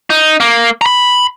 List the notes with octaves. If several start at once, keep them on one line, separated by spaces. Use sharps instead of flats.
D#4
A#3
A#5 B5